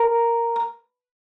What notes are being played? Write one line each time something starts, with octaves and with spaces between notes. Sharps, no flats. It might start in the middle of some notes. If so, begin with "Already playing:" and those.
Already playing: A#4